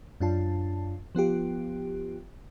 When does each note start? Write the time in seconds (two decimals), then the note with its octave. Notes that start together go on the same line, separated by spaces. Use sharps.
0.20 F#2 D4 F4 A5
1.15 F3 B3 F4 G4